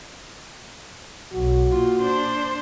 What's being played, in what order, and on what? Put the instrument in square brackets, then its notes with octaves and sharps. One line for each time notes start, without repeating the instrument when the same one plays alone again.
[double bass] B1 [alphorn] F#4
[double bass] A#2 [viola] F4
[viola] D4 C5